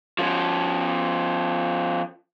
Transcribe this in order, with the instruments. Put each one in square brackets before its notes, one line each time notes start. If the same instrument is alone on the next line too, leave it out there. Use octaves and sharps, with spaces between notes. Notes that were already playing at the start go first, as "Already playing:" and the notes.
[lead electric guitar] F3 C#4